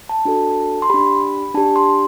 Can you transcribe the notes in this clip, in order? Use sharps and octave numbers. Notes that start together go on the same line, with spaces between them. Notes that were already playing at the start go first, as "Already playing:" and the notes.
A5
D4 F#4 A4
C6
D4 G4 B5
D4 G4 A5
C6